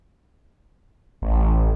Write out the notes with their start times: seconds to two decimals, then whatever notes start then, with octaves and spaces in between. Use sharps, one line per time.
1.22 A1